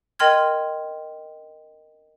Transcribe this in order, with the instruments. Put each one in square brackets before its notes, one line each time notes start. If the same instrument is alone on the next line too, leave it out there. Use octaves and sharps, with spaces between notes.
[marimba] A#4 D#5 G5 C6 F6 G#6